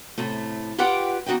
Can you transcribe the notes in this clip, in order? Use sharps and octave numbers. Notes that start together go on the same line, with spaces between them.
A2 C3 A3
F4 G4 B4 D5 F#5 G5
E2 D#4 F#4 D#5 G5